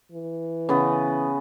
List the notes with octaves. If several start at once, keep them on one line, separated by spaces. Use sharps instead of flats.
E3
C#3 B3